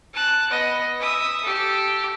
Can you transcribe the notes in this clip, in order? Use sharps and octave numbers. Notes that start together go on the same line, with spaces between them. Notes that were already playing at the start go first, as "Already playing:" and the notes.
A5 F#6
B3 D#5
E5 D#6
G4 A4